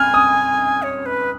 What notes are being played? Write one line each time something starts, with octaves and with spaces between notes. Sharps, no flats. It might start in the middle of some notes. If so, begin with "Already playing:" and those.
Already playing: G#5 F6
D#6
C#5
B4